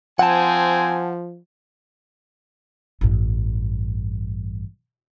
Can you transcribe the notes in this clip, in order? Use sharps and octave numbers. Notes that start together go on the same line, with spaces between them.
F3 C4 F#5 G#5 A5
A1 G2